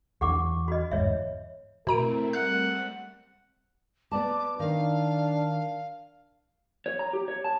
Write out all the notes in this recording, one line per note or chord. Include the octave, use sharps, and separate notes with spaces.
E2 E3 D4 G4 F#5 D6
F#4 D#5
G1 E2 G#2 C#5 E5
B2 A3 C4 E4 A#4 A#5 D7
G3 A3 C4 F#5 F#6
B3 D5 A5 D6
D#3 D4 F5
C#5
A#5
G4
C#5
A5